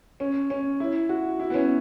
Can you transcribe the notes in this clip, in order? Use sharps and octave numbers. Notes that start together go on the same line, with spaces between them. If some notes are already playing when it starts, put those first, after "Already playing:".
C#4
C#4
E4
F#4
E4
B3
C#4